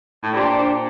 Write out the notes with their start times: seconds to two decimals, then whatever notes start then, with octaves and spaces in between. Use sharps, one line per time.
0.23 A2
0.33 A#2 D4 G4 C5